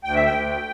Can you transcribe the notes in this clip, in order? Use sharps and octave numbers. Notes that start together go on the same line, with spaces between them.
D2 G5
E5
G5
D2